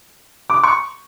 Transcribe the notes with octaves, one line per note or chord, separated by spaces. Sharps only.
D6
C#6